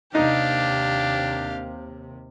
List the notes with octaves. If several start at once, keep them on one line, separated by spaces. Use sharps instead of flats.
D#2 C3 D4 D#4 G4 F5